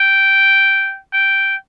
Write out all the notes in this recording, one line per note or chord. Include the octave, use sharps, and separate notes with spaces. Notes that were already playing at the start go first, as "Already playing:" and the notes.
Already playing: G5
G5